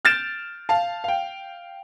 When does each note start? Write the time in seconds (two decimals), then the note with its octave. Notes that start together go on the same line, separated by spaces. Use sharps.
0.05 F6 G6 A6 D7 E7
0.69 F5 A5
1.04 F5 G5